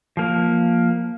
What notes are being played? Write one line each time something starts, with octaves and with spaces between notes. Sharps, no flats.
F3 A#3